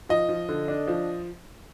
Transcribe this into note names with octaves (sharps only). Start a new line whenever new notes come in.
F3 D#5
F3
D3
D4
F3